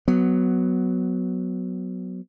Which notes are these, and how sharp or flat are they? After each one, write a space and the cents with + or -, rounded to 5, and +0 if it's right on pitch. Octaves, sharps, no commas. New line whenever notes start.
F#3 +0 B3 +5